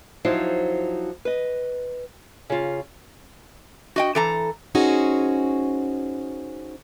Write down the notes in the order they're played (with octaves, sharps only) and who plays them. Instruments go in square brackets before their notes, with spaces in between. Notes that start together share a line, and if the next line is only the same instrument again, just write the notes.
[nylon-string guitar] F3 F#3 D#4 E4 C5
B4 D#5
C#3 F4
[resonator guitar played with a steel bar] F#4 D#5 G5
E3 A4 A#5
[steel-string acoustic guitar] C#4 D#4 F#4 G#4 C5